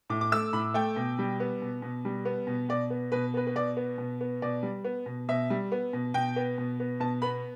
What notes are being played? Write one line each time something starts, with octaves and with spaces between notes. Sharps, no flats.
A2 D6
D6
A3 E6
A2 B5
A3 G5
B2
G3
B3
B2
B2
G3
B3
B2
B2 D5
B3
B2 B4
B3 B4
B4
B2 D5
B3
B2
B3
B2 D5
G3
B3
B2
B2 E5
G3
B3
B2
B2 G5
B3
B2
B3
B2 A5
B3 B5